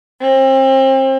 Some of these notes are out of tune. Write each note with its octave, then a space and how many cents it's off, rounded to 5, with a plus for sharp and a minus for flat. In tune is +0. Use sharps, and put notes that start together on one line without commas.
C4 +35